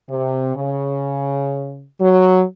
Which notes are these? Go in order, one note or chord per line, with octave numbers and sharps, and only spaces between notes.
C3
C#3
F#3